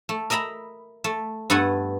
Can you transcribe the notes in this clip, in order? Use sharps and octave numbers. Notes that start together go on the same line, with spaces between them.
A3
A#4 D#5 E5 A#5 B5
A3
G2 A3 B3 A4 F#5 G#5